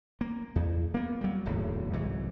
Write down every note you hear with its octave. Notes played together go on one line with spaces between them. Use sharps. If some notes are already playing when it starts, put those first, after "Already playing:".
A#3
E2
A#3 B3
F#3 G3
D1 G#1 E2 A2
C2 G#2 E3 F#3